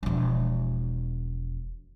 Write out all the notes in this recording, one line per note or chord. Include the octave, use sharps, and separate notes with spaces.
E1 F3